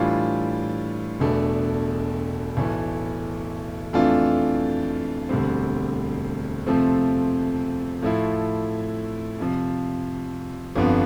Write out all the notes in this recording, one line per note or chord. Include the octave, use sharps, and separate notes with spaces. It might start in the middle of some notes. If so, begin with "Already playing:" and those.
Already playing: A2 E3 G3 D4 F4
E1 E2 B2 A3 D4
B1 A2 E3 A3
F2 E3 A3 D4 F4
E1 D2 D3 G3 C4
F2 C3 F3 A3 C4
A2 F3 A3 E4
F2 C3 F3
G1 F2 D3 F3 B3